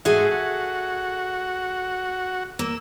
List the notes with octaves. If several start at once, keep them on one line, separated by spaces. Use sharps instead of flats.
G#2 F#4 G#4 A4 E5
F#4
A#3 E6